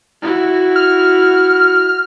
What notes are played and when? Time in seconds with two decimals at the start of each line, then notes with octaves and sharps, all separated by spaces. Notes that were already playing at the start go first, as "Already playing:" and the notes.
0.22 E4 F#4
0.76 F6